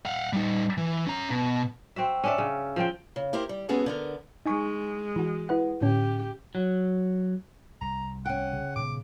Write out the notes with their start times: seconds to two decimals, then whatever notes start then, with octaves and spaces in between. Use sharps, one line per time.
0.05 F5 F#5
0.33 G3 D#4
0.77 E3
1.07 C#4 A#5
1.31 B2
1.96 C4 F#4 E5
2.24 C#4 D4 E5
2.38 C#3
2.76 F3 C4 G5
3.16 C#3
3.33 E4 G4 A#4 C5
3.49 G3
3.69 G#3 B3 C#4 F#4 G#4 A4
3.86 D3 B3 A#4
4.46 G#3 D#4 G#5 C#6
5.16 E3 F#4
5.49 E4 B4 F#5
5.81 A2 D3 C#4 G4
6.55 F#3
7.81 C2 A#5
8.26 C#4 F#5 G5
8.53 C#3
8.76 A#2 D#3 B3 D6